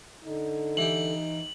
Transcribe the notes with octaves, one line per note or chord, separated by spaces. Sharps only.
D3 D#4
E3 G4 F#7